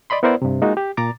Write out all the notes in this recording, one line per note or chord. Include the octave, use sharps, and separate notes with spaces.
D5 D#5 B5 C6
B3 E4 A#4 C5 D5
G2 C3
G#3 A#3 D#4 F4 F#4
G4
A#2 A#5 D6 A6